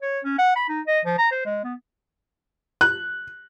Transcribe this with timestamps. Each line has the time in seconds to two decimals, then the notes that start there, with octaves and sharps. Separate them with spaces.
0.02 C#5
0.24 C#4
0.39 F#5
0.56 B5
0.69 D#4
0.87 D#5
1.05 F3
1.18 A#5
1.31 C5
1.45 G#3
1.64 B3
2.81 F#6